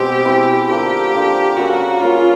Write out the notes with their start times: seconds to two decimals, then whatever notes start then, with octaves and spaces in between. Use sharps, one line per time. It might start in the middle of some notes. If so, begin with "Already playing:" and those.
Already playing: B2 G#3 C4 G4
0.25 B2 G#3 C4 E4
0.69 D3 F3 A#3 G4
1.13 D3 F3 A#3
1.57 C#3 F#3 A#3 C#4 F#4
2.01 C#3 F#3 A#3 C#4 F4